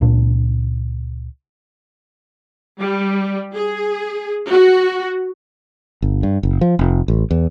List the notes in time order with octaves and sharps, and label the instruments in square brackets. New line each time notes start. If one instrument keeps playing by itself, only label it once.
[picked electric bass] C#2 A#2 D4
[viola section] G3
G#4
F#4
[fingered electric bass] G1
G2
F#1
F3
F1
A1
E2